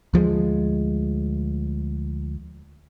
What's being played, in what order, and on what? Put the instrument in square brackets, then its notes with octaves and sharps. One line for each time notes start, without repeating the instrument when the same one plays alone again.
[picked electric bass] D2 F3 F#3 G#3